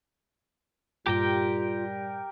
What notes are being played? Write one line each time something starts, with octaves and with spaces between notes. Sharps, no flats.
G2 A#2 G3 F4 G4 A#4 G5